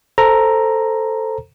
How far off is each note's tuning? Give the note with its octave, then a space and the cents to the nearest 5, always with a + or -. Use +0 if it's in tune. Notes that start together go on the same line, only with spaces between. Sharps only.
A4 +5 C5 +0 A#5 +0